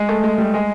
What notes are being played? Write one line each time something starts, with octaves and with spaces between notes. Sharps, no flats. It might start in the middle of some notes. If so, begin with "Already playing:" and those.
Already playing: G#3
A3
G#3
G3
G#3